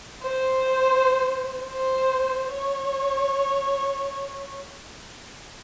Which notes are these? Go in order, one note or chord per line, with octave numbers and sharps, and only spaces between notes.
C5
C5
C#5